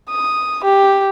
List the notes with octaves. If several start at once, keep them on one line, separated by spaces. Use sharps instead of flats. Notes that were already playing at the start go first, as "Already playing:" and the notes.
D#6
G4